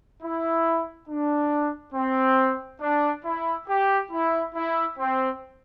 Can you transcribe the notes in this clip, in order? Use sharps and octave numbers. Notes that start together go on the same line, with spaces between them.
E4
D4
C4
D4
E4
G4
E4
E4
C4